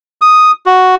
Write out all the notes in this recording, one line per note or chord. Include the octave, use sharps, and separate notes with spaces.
D#6
F#4